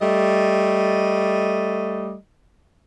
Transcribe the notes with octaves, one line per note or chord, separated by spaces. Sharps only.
G3 A3 D#5